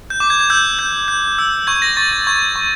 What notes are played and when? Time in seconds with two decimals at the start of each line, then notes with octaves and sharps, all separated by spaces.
0.10 G6
0.20 D6
0.30 G#6
0.40 G#6
0.50 E6 G6
0.79 G6
1.08 G6
1.39 E6
1.67 C#6 G#6
1.82 A#6
1.97 C#6 A6
2.12 G#6
2.27 C#6 G#6
2.56 C#6